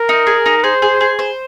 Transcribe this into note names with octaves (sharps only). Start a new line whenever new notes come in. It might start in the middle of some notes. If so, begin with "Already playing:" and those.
Already playing: A#4
D#4
G#4
D#4
G#4 C5
G#4
G#4
C5